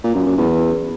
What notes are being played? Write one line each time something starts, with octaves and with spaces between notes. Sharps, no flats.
A#2
F#2
F#2
E2